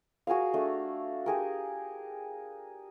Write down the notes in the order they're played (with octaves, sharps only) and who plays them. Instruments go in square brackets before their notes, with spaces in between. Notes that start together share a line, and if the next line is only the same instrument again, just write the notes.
[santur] F#4 G#4 A#4 F5
A3 D4
G4 G#4 A#4